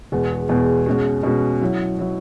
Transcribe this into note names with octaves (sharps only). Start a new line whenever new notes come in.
E2 B2 G#3 B3 G#4
E2 B2 G#3 B3 G#4
B2 G#3 C#4 F#4
B2 G#3 C#4 F#4
F#3 E4 C#5
F#3 E4 C#5